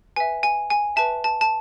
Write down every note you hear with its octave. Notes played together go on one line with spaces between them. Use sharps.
B4 E5 G#5
G#5
G#5
B4 E5 A5
A5
A5